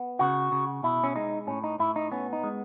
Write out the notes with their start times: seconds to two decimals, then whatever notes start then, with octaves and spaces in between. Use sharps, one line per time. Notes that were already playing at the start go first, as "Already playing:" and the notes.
Already playing: B3
0.19 C#3 F#4
0.52 C#3
0.83 B2 E4
1.04 C#4
1.16 G#3 D#4
1.47 A2 C#4
1.64 D#4
1.79 A2 E4
1.96 D#4
2.12 B3 C#4
2.33 D#4
2.44 G#3